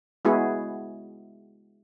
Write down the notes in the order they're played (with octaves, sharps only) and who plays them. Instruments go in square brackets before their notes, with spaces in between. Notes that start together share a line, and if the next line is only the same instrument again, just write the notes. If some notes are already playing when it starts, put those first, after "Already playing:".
[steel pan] G#3 B3 E4 F#4 G#4